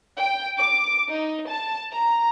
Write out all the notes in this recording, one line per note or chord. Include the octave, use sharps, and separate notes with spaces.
G5
D6
D#4
A5
A#5